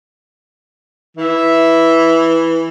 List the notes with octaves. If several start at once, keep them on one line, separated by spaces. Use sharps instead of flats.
E3 E5